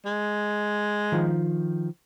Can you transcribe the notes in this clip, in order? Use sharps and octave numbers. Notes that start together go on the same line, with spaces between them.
G#3
D#3 F3